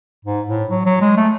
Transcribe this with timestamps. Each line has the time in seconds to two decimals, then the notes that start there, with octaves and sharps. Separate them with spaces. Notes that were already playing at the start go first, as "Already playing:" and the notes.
0.25 G#2
0.48 A2
0.71 F#3
0.86 F#3
1.01 G#3
1.17 A3